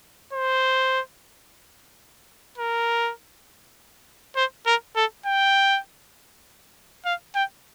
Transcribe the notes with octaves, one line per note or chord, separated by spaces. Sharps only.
C5
A#4
C5
A#4
A4
G5
F5
G5